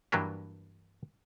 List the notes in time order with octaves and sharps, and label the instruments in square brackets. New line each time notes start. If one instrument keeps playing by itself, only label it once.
[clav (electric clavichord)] G2 E3 F#3 A#3 D4 G4